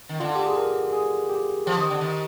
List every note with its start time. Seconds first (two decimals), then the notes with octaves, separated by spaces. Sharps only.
0.09 D#3
0.20 D3 F4
0.35 G4
0.46 G#4
0.57 A#4
0.93 G#4
1.30 G4
1.66 F3 G4
1.77 D#3
1.90 D3
2.01 D#3